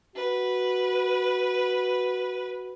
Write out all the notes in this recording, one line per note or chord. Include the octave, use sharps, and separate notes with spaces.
F#4 B4